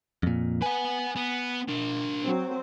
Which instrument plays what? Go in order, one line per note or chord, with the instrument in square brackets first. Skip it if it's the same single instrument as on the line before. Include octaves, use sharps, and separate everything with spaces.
[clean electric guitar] F2 A#2
[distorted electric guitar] B4 F#5 [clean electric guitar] G#5
[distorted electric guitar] B3
D4 A#4
[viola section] F#3 C4 C5